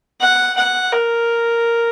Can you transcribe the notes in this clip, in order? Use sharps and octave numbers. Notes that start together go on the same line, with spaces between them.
F#5
F#5
A#4